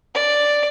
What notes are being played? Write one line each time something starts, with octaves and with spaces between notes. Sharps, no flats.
D5